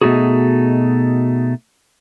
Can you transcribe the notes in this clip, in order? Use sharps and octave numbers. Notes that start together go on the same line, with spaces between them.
B2 G#3 A3 D#4 F#4 G#4